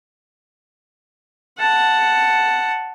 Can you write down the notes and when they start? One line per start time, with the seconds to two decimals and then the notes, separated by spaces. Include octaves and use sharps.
1.59 F#5 A5